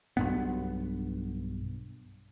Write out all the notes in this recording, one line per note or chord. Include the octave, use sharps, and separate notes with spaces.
B1 G2 B3